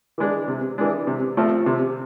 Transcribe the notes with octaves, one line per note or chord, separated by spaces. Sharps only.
E3 G#3 D4
C3
E3 G#3 D4
C3
F3 A3 C4
C3